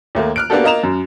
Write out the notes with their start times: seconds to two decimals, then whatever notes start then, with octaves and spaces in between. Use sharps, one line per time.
0.15 D#2 A3 A#3
0.36 F6 F#6 D7
0.50 A#3 B3 D4 F#4 G4 A4
0.64 A#3 F4 D#5 A#5 E7 F7
0.83 F#2